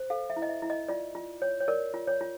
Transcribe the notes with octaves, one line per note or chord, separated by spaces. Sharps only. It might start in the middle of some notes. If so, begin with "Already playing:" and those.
Already playing: C5
A4 F5
E5
E4
D#5
E5
E4
D#5
F4 D5
F4
C#5
C#5
A#4 D5
F4
C#5
F4